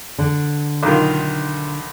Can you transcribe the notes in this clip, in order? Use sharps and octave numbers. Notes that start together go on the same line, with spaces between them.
D3
B1 D#3 F4